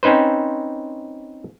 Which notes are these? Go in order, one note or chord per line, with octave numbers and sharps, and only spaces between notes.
C4 C#4 D#4 B4 C5